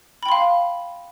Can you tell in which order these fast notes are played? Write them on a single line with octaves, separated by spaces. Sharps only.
B5 G5 C6 F5